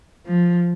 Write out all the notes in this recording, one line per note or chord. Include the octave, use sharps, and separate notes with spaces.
F3